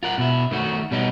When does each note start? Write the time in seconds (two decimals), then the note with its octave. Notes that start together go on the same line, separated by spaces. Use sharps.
0.03 F4 A#4 F#5
0.18 B2 E4
0.51 D#3 A3 F#4
0.91 B2 G3 B3 D#4